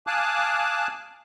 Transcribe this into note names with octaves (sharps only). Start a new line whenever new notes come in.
F5 G#5 A5 D6 D#6 F#6